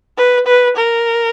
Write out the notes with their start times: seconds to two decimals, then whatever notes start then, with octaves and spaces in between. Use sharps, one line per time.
0.18 B4
0.47 B4
0.77 A#4